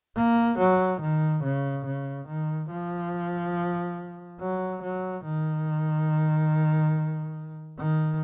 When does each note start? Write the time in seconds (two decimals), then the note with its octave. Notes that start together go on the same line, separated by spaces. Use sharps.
0.16 A#3
0.58 F#3
1.01 D#3
1.43 C#3
1.85 C#3
2.28 D#3
2.70 F3
4.40 F#3
4.82 F#3
5.24 D#3
7.78 D#3